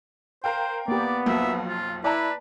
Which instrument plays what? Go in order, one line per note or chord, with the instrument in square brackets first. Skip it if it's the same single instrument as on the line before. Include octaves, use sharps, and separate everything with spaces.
[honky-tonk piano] A#4 F5 G5 [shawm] C5
[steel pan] A#3 G4 [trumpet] B3 [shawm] D5
[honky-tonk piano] B1 F2 F#3 [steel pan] A#3 [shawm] E5
[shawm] F4
[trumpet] E4 [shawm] B4 [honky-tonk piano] D5 A5 A#5